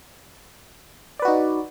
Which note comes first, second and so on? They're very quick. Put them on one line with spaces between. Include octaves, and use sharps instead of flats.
D5 B4 F#4 D#4